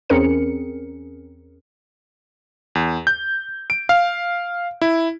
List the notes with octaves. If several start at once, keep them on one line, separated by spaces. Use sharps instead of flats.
E2 C4 C#4 G#4 A#4 C#7
E2
G6
D7
F5
E4